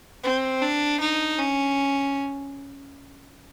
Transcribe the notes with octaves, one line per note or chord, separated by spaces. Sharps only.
C4
D4
D#4
C#4